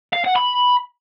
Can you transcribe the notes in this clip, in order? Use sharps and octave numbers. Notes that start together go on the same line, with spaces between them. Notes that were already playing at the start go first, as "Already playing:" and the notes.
F5
F#5
B5